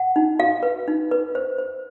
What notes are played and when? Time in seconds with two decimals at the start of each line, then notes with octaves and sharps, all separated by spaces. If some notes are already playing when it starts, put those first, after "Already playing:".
Already playing: F#5
0.16 D#4
0.39 F#4 F5
0.63 B4
0.88 D#4
1.11 B4
1.35 C5
1.58 C5